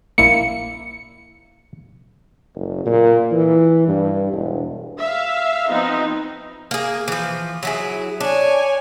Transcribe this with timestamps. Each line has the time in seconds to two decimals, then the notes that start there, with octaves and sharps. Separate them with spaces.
0.18 A#1 A#3 E4 C#7
2.55 F#1
2.86 A#2
3.31 E3
3.88 G2
4.33 E1
4.99 E5 F5
5.69 F3 B3 C4 D#4
6.71 A#3 G#4
7.08 E3 F3
7.63 F#3 E4 G#4
8.20 D4 C#5 G#5